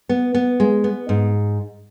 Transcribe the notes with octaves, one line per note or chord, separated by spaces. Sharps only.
B3
B3
G#3
B3
G#2